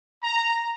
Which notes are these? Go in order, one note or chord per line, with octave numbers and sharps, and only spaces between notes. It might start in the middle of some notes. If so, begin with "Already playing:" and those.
A#5